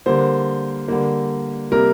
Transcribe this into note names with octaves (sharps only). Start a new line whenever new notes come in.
D3 G3 A#3 C5
D3 G3 A#3
C3 G3 A#3 A#4